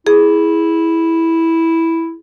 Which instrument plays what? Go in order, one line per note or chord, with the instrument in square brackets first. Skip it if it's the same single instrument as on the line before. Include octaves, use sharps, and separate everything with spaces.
[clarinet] E4 [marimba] G#4